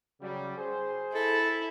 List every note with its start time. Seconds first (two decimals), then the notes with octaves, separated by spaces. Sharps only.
0.21 C#3 F#3 G3
0.57 G#4 C5
1.15 E4 A4